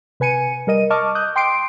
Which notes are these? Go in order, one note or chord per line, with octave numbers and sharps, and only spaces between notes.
C3 B4 G#5 C#7 D#7
G3 A#4 D#5 D#7
D#5 A5 C#6 D6 F6
D#6 F#6 G6
G5 C6 D6 C7 D7